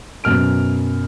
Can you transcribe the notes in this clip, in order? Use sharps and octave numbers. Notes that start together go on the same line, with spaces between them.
F#2 B2 F6 D7